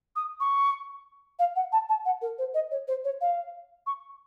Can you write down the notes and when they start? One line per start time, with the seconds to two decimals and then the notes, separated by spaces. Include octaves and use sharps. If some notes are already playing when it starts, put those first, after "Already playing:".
0.16 D#6
0.40 C#6
1.39 F5
1.56 F#5
1.72 A5
1.89 A5
2.05 F#5
2.22 A#4
2.38 C5
2.54 D#5
2.71 C#5
2.88 C5
3.04 C#5
3.21 F5
3.87 C#6